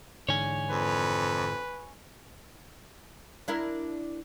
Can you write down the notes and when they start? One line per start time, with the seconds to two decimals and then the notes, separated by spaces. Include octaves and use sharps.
0.29 G#2 D3 E3 C#5 G#5
0.71 F2 B4
3.48 D4 E4 A#4